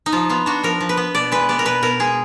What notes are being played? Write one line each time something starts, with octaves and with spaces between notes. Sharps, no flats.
D#4
F3 F4
B3 F4
D4 F#4
F3 A#4
F3
B4
B3
B2 D5
G#3 B4
B3 D5
A#4
B2 B4
B2 A#4
G#3 G#4